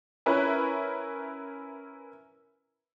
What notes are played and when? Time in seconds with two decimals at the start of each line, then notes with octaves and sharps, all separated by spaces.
0.26 C#4 E4 A#4 B4